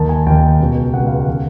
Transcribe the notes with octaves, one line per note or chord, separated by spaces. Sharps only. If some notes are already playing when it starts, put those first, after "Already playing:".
Already playing: D#2 D#3 A5
G#5
D#2 D#3 G5
C#2 B2
C#2 B2 F#5
F5
F#5
D#3